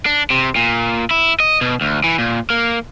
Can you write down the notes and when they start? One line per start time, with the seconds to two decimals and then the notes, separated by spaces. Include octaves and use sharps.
0.06 D4
0.30 C3
0.56 A#2
1.11 E4
1.40 D#5
1.61 B2
1.81 D2
2.04 E3
2.18 A#2
2.50 A#3